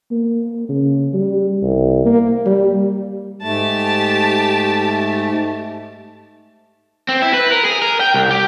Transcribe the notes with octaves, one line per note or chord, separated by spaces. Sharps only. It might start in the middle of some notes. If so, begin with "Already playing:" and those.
A#3
C#3
G3
C2
A#3
G3
G#2 A3 G4 A5
C4
E4
B4
A#4
G#4
A#4
G5
C2
G4